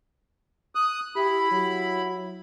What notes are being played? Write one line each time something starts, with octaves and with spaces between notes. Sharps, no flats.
D#6 F#6
E4 G4 B5
F#3